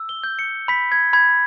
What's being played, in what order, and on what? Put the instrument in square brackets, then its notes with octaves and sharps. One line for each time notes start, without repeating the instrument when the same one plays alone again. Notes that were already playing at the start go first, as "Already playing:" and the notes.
Already playing: [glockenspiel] E6
G7
G6
C#7
B5 B6
G#6
B5 G#6